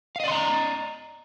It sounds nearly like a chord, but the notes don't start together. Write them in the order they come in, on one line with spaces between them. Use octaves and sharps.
F5 D#5 D5 C6 A#5